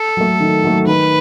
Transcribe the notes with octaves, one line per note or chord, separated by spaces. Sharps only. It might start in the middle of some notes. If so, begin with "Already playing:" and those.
Already playing: A4
F#3 A3
D#3
F#3 A3
D#3 B4